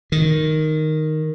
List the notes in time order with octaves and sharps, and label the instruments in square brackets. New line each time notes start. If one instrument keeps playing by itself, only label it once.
[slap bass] D#3